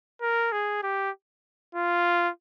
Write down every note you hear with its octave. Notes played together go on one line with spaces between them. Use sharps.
A#4
G#4
G4
F4